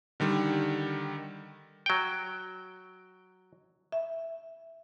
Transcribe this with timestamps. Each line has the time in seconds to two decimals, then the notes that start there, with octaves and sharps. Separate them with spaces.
0.20 D3 D#3 G3
1.86 F#3 G5
3.92 E5